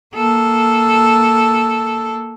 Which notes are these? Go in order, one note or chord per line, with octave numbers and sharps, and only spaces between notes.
A#3 A4